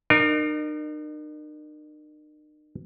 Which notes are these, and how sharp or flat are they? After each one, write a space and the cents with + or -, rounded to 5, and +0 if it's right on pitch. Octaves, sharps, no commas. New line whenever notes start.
D#4 -45 A#4 +0 D#5 -35